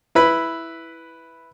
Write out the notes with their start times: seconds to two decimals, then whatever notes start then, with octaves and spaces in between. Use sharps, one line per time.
0.15 E4 B4 B5